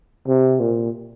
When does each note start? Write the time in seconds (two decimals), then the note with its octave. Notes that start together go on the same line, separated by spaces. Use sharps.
0.27 C3
0.60 A#2